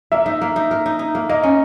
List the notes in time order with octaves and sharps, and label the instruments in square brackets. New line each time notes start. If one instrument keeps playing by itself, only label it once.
[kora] A#3 [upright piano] E5
[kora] D#4
A#3
D#4
A#4
D#4
D#4
A#3
[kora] A#3 [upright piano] D#5
[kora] C#4